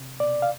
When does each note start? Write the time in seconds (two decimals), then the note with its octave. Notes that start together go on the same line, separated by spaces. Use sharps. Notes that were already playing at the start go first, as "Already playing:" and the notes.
Already playing: C3
0.20 B2 D5
0.42 F5